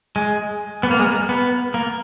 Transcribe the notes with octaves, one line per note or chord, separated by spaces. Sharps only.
G#3
B3
A#3
G#3
A#3
B3
A#3